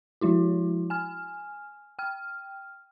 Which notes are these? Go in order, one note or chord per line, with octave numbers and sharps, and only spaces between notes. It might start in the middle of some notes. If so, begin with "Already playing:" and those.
F3 G#3 E4 F#4
G#5 F6
G5 F6